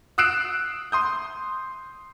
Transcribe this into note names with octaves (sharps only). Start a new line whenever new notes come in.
D#6 E6 F#6 C7 D7 E7
C6 D#6 G6